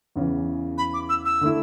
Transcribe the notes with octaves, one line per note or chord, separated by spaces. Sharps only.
E2 C#3 E3
B5
D6
E6
E6
D3 A3 E4